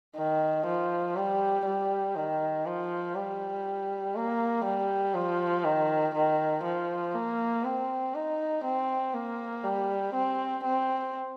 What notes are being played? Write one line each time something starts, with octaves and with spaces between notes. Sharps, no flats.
D#3
F3
G3
G3
D#3
F3
G3
A#3
G3
F3
D#3
D#3
F3
A#3
C4
D#4
C4
A#3
G3
C4
C4